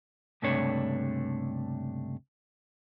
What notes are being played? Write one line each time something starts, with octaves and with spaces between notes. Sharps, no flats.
C#2 G2 C3 A3 D4 C#5